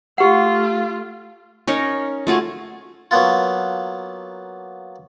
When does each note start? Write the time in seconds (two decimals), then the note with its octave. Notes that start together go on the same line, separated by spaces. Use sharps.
0.18 A3 F4 G4 F#5
1.67 C#4 D#4 A#4 C#5
2.27 A3 F4 F#4 G#4
3.11 F#3 A#3 B3 F4